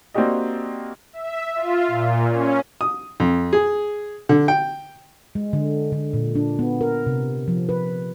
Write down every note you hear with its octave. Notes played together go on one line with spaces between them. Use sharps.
A#3 C4 D4 F#4 G4 D#5
E5
F4
A#2
C#4
D#6
F2
G#4
D3
G5
G#3
D3
D3
A#2
D4
B3
A#4
C3
F3
B4